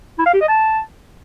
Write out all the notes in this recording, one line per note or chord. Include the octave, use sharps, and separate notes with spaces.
E4
F5
G4
D#5
A5